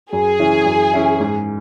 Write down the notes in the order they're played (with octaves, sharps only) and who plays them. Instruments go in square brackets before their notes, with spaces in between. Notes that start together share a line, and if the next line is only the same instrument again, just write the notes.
[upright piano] F#2 [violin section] G#4
[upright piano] E3 C#4 E4
F#2
E3 C#4 E4
G#2